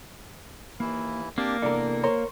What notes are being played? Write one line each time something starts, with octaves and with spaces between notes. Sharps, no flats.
D#2 E3 A#3 E4
A#3 C4 D4 G4 D5
E2 C3 D4 E4 A4 A#4
A#4 C5 C#5